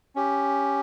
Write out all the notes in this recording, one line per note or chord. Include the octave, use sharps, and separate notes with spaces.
C#4 G4